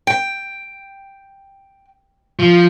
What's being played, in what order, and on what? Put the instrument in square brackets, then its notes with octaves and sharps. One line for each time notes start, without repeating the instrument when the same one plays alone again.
[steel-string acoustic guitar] G5
[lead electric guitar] F3